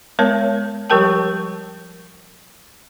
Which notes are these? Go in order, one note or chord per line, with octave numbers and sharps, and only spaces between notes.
G#3 B3 A#4 C#5 A5
F3 G3 G4 A#4 G5 A5